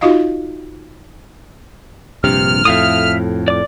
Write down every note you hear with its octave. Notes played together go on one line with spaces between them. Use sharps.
D#4 F4 F#4 D#5 F5
A#1 G2 C3 F6
F2 A2 E5 F5 D#6
D5 D6